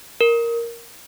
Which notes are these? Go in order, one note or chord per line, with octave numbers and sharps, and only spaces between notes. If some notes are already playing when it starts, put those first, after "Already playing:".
A#4